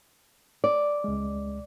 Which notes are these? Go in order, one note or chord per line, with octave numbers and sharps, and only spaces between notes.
D5
C#2 G#3